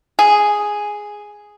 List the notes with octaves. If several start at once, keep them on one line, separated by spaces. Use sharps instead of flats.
G#4